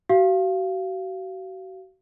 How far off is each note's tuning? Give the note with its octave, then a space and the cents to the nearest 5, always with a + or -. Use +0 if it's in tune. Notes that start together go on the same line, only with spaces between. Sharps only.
F#4 +40 F5 -15